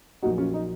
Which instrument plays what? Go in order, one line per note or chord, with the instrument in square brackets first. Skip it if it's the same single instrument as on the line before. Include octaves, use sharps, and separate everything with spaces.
[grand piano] A#1 A#2 F#3 D#4 F#4
C#4 F4
D#4